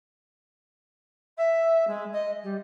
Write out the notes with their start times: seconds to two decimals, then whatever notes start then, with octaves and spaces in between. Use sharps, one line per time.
1.37 E5
1.87 G#3
2.12 D#5
2.43 G3